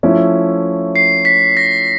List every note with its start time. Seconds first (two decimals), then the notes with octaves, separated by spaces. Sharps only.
0.03 F3 A3 C#4 E4
0.96 C7
1.25 B6
1.57 A#6